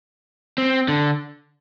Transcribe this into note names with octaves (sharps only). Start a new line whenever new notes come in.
C4
D3